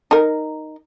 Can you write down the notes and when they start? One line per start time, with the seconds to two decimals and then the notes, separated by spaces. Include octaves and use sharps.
0.11 D#4 A#4